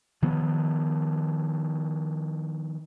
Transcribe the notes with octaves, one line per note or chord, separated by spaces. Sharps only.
D#3 F3 B3